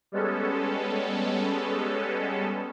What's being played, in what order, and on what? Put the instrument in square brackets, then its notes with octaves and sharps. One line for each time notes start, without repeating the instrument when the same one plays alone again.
[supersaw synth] G3 G#3 B3 C#4 A4